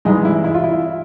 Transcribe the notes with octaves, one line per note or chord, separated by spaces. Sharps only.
G2 E3 G#3 D#4
E4
E4
F4
E4